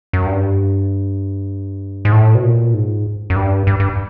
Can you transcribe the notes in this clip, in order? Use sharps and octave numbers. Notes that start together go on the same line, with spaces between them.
F#2
G2
G#2
A2
B2
A#2
G#2
F#2
G2
G2
G2